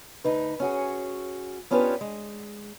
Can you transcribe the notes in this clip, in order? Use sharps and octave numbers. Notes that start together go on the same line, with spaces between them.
D2 D#4 B4
C#4 F#4 G#4
B3 C#4 D4 F4 G4 B4
G#3